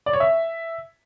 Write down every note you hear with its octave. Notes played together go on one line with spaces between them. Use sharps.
D5
C#5
E5